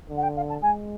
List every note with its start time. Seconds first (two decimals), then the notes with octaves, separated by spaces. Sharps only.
0.10 D3
0.17 F#5
0.23 G5
0.36 F5
0.49 A5
0.62 G#3 G#5